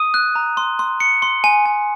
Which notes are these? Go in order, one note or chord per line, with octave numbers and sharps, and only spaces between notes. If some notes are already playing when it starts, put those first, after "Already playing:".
Already playing: D#6 D#7
F#6
A#5
C6
C6
C6 C#7
C6
G#5
G#5